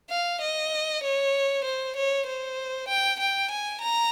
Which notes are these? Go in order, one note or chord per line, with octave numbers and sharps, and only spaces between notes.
F5
D#5
C#5
C5
C#5
C5
G5
G5
G#5
A#5